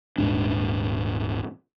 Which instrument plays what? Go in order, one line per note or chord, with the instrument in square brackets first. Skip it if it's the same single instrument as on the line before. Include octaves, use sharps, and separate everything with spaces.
[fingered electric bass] D#1 G#2 D4